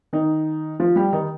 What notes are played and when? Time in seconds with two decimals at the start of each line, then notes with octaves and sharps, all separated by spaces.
0.13 D#3 D#4
0.80 F3 F4
0.96 G3 G4
1.13 D#3 D#4